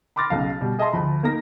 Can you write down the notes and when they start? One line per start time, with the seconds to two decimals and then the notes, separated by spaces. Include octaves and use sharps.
0.16 B5 C6 D6 F6 A6 A#6
0.30 B1 C#3 F5
0.61 B2 G3
0.78 G#4 D#5 E5 A5 C6
0.93 D2 F3 B5
1.23 A#3 D#4 A#4 A#6